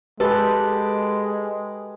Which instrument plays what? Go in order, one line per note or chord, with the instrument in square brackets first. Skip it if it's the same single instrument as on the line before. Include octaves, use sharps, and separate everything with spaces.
[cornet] G#3 [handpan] G4 B4 [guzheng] A4